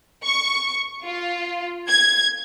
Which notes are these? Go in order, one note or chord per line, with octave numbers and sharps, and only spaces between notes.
C#6
F4
G#6